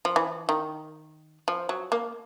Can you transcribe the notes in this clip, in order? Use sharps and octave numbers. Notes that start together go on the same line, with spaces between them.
F3
E3
D#3
F3
F#3
A#3